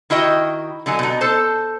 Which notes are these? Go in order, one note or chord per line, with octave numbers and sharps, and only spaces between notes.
D#3 E4 F#4 D#5 G5
D3 F#3 D#4 G#5
B2 D#4
A4 C5 A5